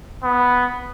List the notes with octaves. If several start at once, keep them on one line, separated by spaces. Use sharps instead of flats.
B3